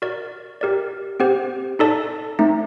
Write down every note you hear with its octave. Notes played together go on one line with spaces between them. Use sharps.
F#4 A#4 D5
G4 A#4 D5
C4 G4 C5 F#5
D#4 A4 D5 A5
A3 C4 D#4